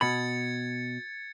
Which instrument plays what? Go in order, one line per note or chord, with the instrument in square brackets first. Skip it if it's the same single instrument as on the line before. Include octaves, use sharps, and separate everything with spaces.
[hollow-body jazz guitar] B2 B5 [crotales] G#6 A6 C#7